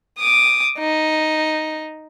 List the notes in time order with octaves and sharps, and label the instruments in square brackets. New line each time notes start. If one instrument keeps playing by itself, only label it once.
[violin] D6 D#6
D#4